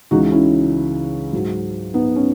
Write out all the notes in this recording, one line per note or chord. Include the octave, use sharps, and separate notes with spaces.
C#2 C#3 E3 D#4 F#4
C#4 E4
G#2 F#3
B3 D#4
C#4